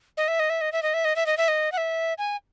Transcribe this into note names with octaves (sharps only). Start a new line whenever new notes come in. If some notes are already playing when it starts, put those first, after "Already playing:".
D#5
E5
D#5
E5
D#5
E5
D#5
E5
D#5
E5
D#5
E5
D#5
F#5
E5
G#5